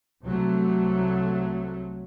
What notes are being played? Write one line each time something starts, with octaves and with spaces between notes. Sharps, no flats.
C2 F#3 A3